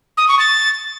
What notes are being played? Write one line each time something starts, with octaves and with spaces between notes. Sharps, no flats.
D#6
C#6
A6